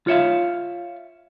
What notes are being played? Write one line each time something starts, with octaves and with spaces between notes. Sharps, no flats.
F4 C#5 E5 F5